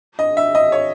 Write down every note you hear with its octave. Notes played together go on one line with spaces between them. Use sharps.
D#5
E5
D#5
C#5